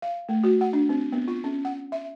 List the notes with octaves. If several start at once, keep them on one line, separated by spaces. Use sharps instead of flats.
F5
A3
F#4
F#5
D4
C4
B3
F4
C#4
F#5
E5